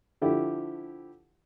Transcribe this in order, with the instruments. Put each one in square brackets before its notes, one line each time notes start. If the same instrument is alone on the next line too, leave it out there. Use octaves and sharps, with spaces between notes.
[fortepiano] D3 F3 E4 G4